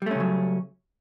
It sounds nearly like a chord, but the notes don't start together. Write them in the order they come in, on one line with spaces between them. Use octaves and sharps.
G3 A3 C#4 C#3 F#3